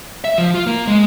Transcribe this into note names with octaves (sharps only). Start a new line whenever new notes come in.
E5
F3
F4
A#3
G#3